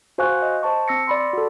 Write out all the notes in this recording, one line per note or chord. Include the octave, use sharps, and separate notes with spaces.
F#4 C5 F5 G#5 C#6 F#6
D#5
C5 A5 C#6
C4 E6 A#6 C#7
D5 B5 C6
F#4 A4